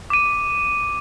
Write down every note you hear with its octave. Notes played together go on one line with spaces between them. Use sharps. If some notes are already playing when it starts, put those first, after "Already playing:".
D6 D#7